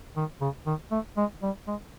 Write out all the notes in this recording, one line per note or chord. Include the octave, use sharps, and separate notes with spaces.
D#3
C#3
D#3
A3
G#3
G3
G#3